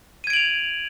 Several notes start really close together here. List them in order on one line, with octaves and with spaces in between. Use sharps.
D#7 G#6 D7 F#7 F7